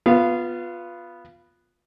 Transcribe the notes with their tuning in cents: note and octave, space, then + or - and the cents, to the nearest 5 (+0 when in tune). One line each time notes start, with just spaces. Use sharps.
B3 +0 F4 +15 F5 -25